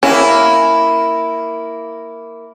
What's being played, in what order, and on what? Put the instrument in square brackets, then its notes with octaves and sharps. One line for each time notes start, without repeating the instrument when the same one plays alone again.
[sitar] A#3 E4 [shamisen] C#4